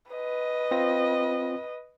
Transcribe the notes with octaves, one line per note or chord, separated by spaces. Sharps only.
B4 D#5
C4 F4 A#6